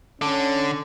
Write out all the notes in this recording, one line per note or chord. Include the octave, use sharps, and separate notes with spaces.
D3 C#4